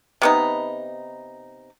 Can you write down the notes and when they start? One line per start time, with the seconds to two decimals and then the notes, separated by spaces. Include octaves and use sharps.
0.22 C3 B3 D#4